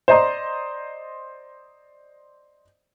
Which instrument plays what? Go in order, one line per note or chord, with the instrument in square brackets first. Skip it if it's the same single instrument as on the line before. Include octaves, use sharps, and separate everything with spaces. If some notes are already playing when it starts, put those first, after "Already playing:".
[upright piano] C5 D5 D#5 A#5 C6